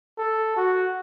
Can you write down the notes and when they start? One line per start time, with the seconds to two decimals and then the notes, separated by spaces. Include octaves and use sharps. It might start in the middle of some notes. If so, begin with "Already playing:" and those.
0.18 A4
0.56 F#4